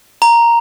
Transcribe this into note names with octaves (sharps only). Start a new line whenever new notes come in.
A#5